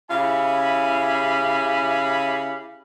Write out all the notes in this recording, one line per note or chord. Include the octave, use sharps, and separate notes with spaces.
C#3 E4 G4 F5 G#5 B5